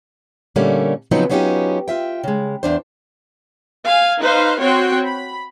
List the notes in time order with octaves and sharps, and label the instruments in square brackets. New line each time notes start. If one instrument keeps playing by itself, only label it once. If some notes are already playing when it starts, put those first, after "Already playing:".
[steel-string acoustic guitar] A#2 D3 G3 A3 A#3 C#4
C#3 F3 F#3 B3 C4 D#4
F#3 B3 C#4 D#4 F4 G4
F4 E5 G5
C#3 G#3
E2 D4 C5
[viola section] F5 G#5
D#4 B4 C5 F5
C4 F#4 C#5 G5 C6
B5